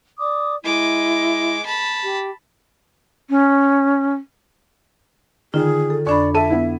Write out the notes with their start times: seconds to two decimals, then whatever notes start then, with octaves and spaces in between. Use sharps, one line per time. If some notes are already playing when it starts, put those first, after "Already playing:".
0.19 D5 D6 D#6
0.64 G#3 E4 D#5 D6
1.65 A5 B5
2.03 G4
3.30 C#4
5.54 D3 D#3 F4 G#4
5.90 A4
6.07 F2 D4 D5 B5 C#6
6.34 A4 E5 A5 D#7
6.50 B3 E4